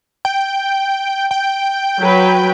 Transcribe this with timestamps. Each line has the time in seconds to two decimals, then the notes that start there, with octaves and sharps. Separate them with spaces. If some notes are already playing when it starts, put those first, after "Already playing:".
0.25 G5
1.31 G5
2.00 F#3 B4